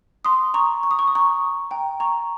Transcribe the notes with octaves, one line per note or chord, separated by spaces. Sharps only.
C6 D#6
A#5 C#6
C#6
D#6
C#6
D#6
A#5 C#6
G5 A#5
A#5 C#6